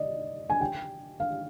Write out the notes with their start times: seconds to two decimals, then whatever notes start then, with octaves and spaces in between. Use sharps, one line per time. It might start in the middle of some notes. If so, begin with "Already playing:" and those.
Already playing: D5 D#5
0.50 G#5
0.61 G5
1.20 F5